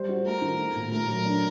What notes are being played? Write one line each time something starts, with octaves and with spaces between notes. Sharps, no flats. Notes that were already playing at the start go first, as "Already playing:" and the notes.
Already playing: G3 C5
F#4
A3 A#4
D#3
A3
A#2
A3 A#4
F#3
D4